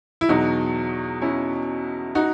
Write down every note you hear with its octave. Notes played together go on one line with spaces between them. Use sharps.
E4
E2 B2 F#3 D#4 F#4
C#4 E4
D#4 F#4